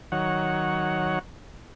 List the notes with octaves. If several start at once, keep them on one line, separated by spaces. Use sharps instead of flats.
D#3 F#3 C#5 F#5